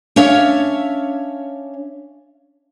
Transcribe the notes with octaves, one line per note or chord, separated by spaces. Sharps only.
C#4 D4 C#5 E5 F5